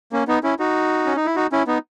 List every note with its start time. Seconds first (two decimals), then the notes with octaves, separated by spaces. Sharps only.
0.12 A#3 C#4
0.28 B3 D#4
0.43 C#4 E4
0.59 D#4 F#4
1.06 C#4
1.16 D#4
1.26 E4
1.36 D#4 F#4
1.52 C#4 E4
1.67 B3 D#4